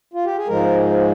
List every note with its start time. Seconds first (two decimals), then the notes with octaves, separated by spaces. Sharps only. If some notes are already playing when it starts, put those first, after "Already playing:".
0.13 F4
0.25 G4
0.36 G#4
0.48 G#2 F3 G#3 A#4